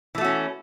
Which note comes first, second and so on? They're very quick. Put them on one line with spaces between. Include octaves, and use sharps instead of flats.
E3 A3 F#4 C#4